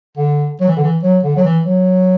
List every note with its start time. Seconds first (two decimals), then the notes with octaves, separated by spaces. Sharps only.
0.17 D3
0.60 F#3
0.68 E3
0.77 D3
0.84 E3
1.03 F#3
1.23 D3
1.36 F#3
1.44 E3
1.66 F#3